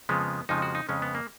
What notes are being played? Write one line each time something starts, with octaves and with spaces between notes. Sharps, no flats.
F2 C#3 F3 G#3 B3
F2 C#3 F3 G#3 D#4
F#4
D#4
F2 C#3 G#3 C#4
B3
A#3